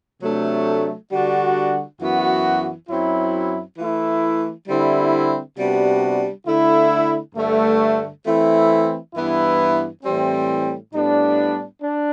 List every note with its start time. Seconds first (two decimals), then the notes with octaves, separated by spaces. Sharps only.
0.21 C3 F#3 A3 D4
1.11 D3 G3 D4 F#4
1.99 F#2 E3 B3 F#4
2.89 F#2 F#3 C4 E4
3.78 E3 A3 E4
4.68 D3 G3 C4 E4
5.56 C3 G3 B3 D4 F#4
6.46 D3 A3 E4
7.35 G2 D3 A3
8.25 E3 A3 C4 E4
9.14 G2 E3 B3 E4
10.03 A2 E3 G3 C4
10.93 A2 G3 B3 D4
11.82 D4